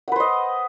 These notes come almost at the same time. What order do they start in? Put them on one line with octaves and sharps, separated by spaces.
F#5 B4 C5 D#5